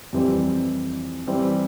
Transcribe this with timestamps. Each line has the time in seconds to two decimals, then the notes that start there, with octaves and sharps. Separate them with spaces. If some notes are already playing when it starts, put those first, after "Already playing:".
0.13 F2 E3 G3 C4 G4
1.27 E3 G3 C4 G4 C5